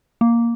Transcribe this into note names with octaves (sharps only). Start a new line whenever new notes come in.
A#3